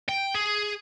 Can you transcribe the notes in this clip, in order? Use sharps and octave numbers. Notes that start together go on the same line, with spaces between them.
G5
G#4